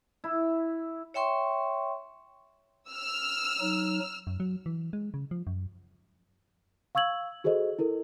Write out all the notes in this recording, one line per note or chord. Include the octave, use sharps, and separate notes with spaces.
E4
C#5 E5 G5 C6 C#6
E6 F6
F#3 D#4
F#2
F#3
E3
G#3
C#3
F3
F#2
F5 C#6 E6 G#6 F#7
F#4 G#4 A4 C5 D#5
E4 A4 A#4